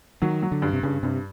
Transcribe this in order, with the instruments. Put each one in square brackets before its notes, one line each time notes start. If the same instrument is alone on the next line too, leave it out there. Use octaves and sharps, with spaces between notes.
[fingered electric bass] D#3 [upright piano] F#3
[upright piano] F#3
[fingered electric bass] D3
[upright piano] G2
[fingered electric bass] C3
[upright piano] G2 [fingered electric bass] C#3
[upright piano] G2 [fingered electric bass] C3